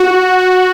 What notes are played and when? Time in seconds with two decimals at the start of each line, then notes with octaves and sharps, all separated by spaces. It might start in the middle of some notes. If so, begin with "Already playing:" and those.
Already playing: F#4